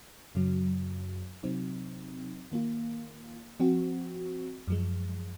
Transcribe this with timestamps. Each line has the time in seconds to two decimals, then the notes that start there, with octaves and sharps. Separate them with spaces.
0.35 F#2 C#3 F#3
1.43 C3 F#3 C4 D#4
2.52 D#3 A#3 F4
3.60 F3 C4 F#4
4.68 F#2 F3 G#3